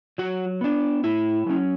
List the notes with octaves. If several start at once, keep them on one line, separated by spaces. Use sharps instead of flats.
F#3 F#4
B3 D4
A2 E4
F#3 C#4